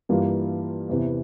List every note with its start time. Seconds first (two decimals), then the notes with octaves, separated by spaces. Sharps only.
0.09 G2 E3 G3 A#3 F4
0.90 E2 C3 E3